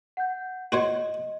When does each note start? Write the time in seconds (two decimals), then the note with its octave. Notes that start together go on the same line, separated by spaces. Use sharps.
0.17 F#5 G6
0.72 F#4 C5 C#5 D#5